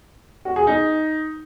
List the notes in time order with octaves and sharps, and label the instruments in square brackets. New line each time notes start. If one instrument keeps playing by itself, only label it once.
[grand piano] F#4
G#4
D#4